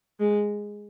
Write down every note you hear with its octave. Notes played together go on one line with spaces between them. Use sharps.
G#3